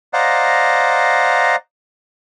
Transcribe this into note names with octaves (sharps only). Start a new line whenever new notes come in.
C5 D5 D#5 F5 F#5 A#5